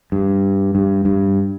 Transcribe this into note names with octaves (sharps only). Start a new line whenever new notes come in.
G2
G2
G2